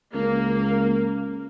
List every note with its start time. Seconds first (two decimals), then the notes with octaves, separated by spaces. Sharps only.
0.14 C#2 A#3